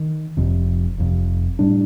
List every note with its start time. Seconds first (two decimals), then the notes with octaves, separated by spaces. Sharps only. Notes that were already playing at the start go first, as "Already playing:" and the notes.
Already playing: D#3
0.37 F1 F2 C3
0.98 F1 F2 C3
1.59 A2 G3 D4